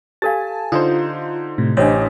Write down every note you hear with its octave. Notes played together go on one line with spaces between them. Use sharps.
G4 A4 F5 G#5 A5 A6
D3 D#4 F4 C5 D#6
A2 C3
A1 E3 D4 G4 C5 C#5 D#5